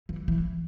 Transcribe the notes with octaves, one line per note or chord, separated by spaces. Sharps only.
E3
E3